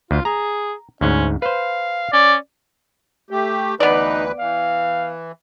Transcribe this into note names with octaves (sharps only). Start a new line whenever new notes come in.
D2 F4
G#4 A#5
D2 G#2 C#4
B4 C5 F5
C#4 D5
A3 G4
D2 E3 B3 D#4 B4 D5
E3 F5